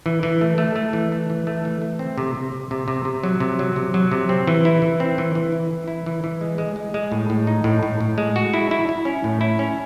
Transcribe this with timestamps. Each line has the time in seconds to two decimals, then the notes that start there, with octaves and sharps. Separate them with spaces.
0.06 E3
0.23 E3
0.41 A3
0.58 A3
0.76 A3
0.93 E3
1.12 A3
1.30 E3
1.47 A3
1.65 E3
1.82 A3
1.99 C4
2.18 C3
2.35 C3
2.52 C3
2.71 C3
2.88 C3
3.05 C3
3.24 F#3
3.40 C3
3.59 F#3
3.76 C3
3.94 F#3
4.12 C3
4.29 C4
4.47 E3
4.65 E4
4.82 E3
5.00 C4
5.18 E3
5.35 E3
5.52 E4
5.71 E3
5.88 E4
6.06 E3
6.24 E3
6.41 G#3
6.58 G#3
6.76 G#3
6.94 G#3
7.12 A2
7.30 A2
7.47 D#4
7.64 A2
7.83 A2
8.01 A2
8.18 G#3
8.36 F#4
8.54 E4
8.71 E4
8.89 E4
9.05 C#4
9.24 A2
9.41 E4
9.59 C#4